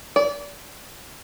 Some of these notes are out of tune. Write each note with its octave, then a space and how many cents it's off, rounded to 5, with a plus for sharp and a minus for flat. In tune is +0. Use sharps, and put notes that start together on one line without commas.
D5 -30